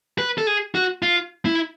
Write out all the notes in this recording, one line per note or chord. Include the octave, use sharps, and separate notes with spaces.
B4
A4
G#4
F#4
F4
E4